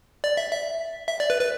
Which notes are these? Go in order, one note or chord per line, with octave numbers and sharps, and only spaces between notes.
D5
E5
E5
E5
D5
B4
B4